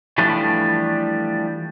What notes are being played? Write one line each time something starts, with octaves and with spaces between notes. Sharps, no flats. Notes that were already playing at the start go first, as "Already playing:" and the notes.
E3 F3 G3 A3 D4